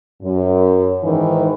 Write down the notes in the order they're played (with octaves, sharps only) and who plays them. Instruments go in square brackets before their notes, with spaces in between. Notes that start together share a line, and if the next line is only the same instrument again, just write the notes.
[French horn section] F#2
G#2 D#3 E3